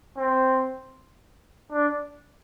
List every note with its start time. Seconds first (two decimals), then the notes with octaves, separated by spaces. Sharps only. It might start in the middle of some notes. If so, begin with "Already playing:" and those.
0.17 C4
1.72 D4